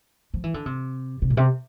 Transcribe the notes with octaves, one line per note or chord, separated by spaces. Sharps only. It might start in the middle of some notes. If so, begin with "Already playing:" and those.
F3
E3
D3
C3
C3
A#2
C3